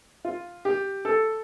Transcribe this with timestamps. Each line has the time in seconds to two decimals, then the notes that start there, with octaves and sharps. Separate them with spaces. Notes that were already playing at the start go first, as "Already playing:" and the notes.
0.25 F4
0.65 G4
1.05 A4